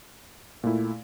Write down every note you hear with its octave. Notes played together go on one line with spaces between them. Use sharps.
A#2 A3 E4